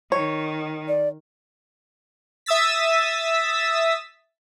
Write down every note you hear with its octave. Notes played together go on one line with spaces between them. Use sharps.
D#3 C#5
D5
E5 D#6 E6 A6 B6